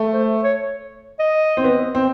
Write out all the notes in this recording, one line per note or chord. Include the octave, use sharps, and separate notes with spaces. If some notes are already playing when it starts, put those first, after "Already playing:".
Already playing: A3
C5
C#5
D#5
C4
B3
C4